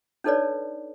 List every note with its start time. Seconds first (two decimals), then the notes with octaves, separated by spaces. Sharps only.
0.24 D4 D#4 A4 B4 C#5 D5